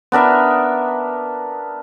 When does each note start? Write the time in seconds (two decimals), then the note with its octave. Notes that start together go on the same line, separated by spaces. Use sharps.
0.12 B3 D4 A#4 E5